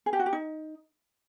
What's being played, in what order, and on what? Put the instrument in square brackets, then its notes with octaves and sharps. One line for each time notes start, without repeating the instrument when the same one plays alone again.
[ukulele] G#4
G4
F#4
G4
D#4